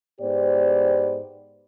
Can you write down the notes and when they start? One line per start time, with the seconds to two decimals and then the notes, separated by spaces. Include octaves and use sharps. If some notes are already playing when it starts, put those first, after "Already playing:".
0.20 G#2 B3 G4 C5 D5